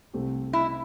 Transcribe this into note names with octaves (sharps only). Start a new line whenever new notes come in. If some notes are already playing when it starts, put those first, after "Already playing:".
C2 C3 A3 C4 G4
E4